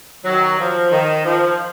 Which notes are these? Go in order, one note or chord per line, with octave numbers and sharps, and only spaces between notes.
D#3 F#3
F3
D#3
F3